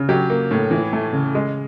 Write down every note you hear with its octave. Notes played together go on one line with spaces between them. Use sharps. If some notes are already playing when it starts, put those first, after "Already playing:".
Already playing: C#3
F#3 G4
A#3
A2
E3
A3
C#3
G#3